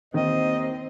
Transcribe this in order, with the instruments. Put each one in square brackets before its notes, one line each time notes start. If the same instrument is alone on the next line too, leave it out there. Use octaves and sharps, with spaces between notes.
[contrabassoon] D#2 [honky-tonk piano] D#3 [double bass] C4 [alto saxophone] D#5